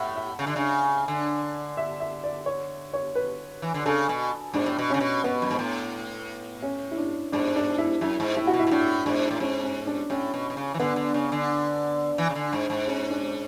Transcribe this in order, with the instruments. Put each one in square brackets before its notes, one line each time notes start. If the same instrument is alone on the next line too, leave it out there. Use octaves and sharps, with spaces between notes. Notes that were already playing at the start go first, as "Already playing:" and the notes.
Already playing: [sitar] A2 [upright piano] E5 F#5
[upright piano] E5
[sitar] C#3
D3
C#3
D3
[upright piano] E5
E5
D5
C#5
C#5
B4
[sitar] E3
D3
[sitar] C#3 [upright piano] A4
[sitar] B2
[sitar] G#2 [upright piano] D4
[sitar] A2
B2
[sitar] C#3 [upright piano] C#4
[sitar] B2
[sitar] B2 [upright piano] B3
[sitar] F#2
G#2
A2
[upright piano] C#4
E4
D4
[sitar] G#2 [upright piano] D4
[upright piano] D4
E4
[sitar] F#2 [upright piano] E4
[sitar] G#2
[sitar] A2 [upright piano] E4
[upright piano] F#4
[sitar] B2
[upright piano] E4
[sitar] B2
[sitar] A2 [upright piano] D4
[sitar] G#2 [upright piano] D4
[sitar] A2
[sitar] G#2 [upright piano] C#4
[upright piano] C#4
D4
[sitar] A2 [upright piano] C#4
[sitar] B2
B2
C#3
E3
[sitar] D3 [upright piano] B3
[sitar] D3
C#3
D3
E3
C#3
D3
G#2
G#2
[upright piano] C#4
D4